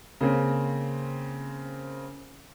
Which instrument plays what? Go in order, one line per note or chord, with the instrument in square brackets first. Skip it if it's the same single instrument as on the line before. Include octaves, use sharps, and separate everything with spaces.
[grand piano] C#3 A#3 C4